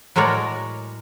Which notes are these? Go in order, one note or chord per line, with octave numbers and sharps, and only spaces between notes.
A2 F#3 G#3 A#4 C#5 D5